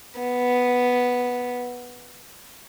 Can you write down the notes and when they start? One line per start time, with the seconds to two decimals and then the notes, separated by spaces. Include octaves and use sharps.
0.20 B3